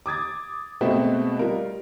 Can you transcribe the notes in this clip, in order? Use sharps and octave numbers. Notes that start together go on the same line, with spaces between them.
D6 D#6 G#6 A6
B2 G#3 A3 B3 C4 F#4
G3 F4 A#4